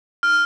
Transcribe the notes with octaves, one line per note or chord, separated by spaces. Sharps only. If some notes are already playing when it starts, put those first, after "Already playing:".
F6